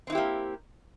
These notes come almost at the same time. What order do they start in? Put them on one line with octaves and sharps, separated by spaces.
C4 D#4 E4 G4 A#3